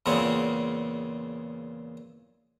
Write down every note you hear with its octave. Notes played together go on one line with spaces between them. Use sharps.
E2 A#2 C#3 G#3 C4